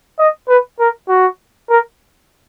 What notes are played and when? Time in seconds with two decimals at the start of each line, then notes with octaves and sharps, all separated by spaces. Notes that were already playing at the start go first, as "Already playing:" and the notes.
0.19 D#5
0.49 B4
0.80 A#4
1.09 F#4
1.70 A#4